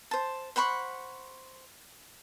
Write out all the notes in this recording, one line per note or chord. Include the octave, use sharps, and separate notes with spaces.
C5 A5
C5 F#5 B5 C#6